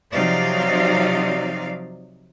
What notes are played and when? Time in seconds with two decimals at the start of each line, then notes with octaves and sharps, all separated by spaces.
0.13 C3 F3 F#3 D#4 D5 F5